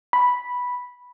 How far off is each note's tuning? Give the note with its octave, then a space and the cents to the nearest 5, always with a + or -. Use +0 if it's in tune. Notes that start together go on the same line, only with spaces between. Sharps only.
B5 -5